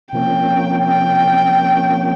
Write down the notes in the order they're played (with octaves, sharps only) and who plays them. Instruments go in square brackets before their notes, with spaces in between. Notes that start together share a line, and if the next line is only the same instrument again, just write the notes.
[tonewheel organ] C3 F3 A#3 C#4 [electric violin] G5
[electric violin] G5